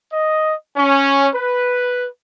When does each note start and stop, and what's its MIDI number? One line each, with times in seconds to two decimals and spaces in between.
0.12 0.53 75
0.76 1.27 61
1.33 2.06 71